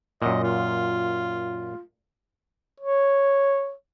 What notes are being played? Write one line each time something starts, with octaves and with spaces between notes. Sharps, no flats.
F#2 A#2 D#5
F4
C#5